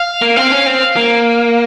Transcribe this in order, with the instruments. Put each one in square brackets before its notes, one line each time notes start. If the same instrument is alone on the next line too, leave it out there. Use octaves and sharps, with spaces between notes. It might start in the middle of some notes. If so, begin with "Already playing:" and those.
Already playing: [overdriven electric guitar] F5
[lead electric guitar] A#3
[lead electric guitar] C4 [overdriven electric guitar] F5
[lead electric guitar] C#4
C4
A#3